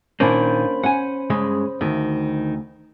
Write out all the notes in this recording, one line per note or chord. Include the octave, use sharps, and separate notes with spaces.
A#2 D#3 A#3 C#4 D4 C5 B5
C#4 F#5 G#5
G2 C#3 G#3
D2 D#3